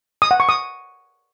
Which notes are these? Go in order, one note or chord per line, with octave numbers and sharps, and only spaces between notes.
D#6
F#5
C#6
D#6